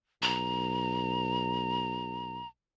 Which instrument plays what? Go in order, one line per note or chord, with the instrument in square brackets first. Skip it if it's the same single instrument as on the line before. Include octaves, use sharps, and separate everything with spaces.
[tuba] B1 [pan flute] A#5